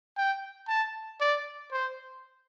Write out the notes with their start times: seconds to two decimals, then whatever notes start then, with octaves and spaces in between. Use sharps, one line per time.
0.17 G5
0.68 A5
1.21 D5
1.72 C5